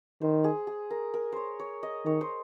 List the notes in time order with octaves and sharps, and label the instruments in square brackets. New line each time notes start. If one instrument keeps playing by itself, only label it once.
[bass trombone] D#3 [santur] C5
[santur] G#4
G#4
A#4
A#4
C5 C#5
C#5
D#5
[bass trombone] D#3 [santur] C#5
[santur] C5